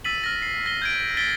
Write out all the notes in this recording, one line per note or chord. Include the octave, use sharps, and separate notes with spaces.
E6 A6 B6 D#7 F#7
F6 A#6
C7
A#6 G7
G6 G#6 D7
A6 B6 D7 G7